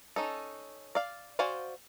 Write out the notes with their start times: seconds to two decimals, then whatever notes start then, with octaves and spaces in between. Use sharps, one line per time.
0.16 C#4 D#4 A4
0.95 D5 F5
1.39 F#4 C5 D5 F5 G#5